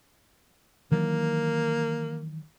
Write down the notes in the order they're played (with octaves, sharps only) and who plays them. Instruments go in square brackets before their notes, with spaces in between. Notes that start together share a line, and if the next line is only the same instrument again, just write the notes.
[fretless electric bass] D#3 E3 F#3 [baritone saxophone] A#3